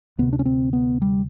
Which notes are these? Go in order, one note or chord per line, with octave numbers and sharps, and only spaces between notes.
D2 C3 B3
D4
C#4
C4
B3
G3